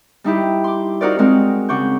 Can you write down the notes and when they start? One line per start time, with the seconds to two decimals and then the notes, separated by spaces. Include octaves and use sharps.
0.24 G3 D#4 E4 G4
0.64 C6 D6
1.01 D#4 F4 F#4 A#4 C5 D5
1.19 G#3 C4 D#4 F#4 G#4 A#4
1.69 C#3 C#5 F#5 C#6 D6 G6